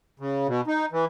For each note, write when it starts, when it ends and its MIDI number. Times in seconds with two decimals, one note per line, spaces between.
0.20 0.47 49
0.47 0.61 47
0.67 0.86 63
0.92 1.05 52